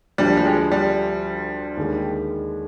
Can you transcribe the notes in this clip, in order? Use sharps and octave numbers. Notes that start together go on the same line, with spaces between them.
D2 D3 F3 G3
G3
G#3
G3
D#2 D3 G#3